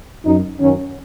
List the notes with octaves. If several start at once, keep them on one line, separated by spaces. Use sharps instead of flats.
F#2 F#3 D#4
F#2 D#3 F#3 C#4